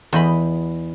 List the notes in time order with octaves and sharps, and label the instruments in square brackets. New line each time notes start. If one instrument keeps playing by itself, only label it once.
[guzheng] E2 D#5 B5